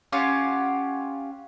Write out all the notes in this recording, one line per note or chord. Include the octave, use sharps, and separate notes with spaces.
C#4 F4 G4 F#5